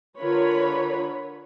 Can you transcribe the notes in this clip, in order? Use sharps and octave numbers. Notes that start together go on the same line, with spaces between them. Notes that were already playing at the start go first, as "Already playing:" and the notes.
D3 F4 A#4 B4 C#5 B5